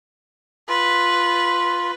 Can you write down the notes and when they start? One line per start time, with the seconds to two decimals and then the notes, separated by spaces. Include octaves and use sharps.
0.69 F4 B4